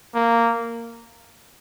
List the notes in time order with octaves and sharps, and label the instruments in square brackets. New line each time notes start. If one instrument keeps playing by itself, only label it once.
[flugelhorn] A#3